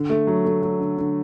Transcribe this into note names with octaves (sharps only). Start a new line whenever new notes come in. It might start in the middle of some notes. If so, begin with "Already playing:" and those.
Already playing: D3
A3
F#3
A3
F#3
D3
D3